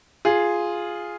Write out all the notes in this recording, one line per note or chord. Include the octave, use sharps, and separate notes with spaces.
F4 G#4